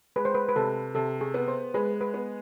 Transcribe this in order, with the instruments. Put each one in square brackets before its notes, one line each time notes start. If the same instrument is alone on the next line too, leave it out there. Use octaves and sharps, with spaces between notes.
[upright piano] G#3 [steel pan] B4
[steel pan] C5
B4
B4
[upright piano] C3 [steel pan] A4
[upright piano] C3 [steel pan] A4
[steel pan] G#4
[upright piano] B3
[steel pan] C5
[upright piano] G#3 [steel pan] B4
[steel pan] B4
[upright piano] B3